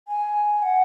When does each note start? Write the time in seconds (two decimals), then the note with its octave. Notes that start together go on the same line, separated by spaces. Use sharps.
0.08 G#5
0.62 F#5